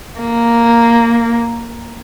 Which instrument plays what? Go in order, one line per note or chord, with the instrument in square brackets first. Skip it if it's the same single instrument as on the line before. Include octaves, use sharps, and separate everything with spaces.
[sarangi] A#3